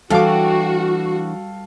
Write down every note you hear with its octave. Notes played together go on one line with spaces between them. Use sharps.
E3 G3 D4 F#4 A4 F5 D6